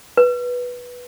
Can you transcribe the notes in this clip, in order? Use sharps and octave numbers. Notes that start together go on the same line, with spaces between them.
B4